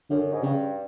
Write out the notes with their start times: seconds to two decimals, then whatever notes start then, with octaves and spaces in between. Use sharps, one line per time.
0.10 F#2 D3
0.33 G#2
0.43 G2 C#3